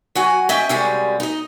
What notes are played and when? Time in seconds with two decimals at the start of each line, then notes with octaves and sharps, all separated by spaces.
0.15 F#3 F#4 G#5
0.49 C#4 D#5 E5 G5
0.69 F#2 C3 G3 G#3 C#4
1.20 D#4 D#5